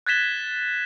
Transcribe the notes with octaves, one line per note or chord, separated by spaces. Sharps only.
F#6 G#6 A6 B6 E7 G7